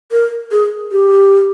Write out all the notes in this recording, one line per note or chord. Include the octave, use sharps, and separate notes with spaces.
A#4
G#4
G4